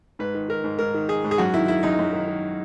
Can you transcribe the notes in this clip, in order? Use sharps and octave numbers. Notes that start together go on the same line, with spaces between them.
G#2 B4
D#3
D#3 A#4
G#2
G#2 A#4
D#3
D#3 G#4
G#2
G#4
F#2 F#4
D#3 E4
D#3 E4
F#2 D#4
F#2
D#3
D#3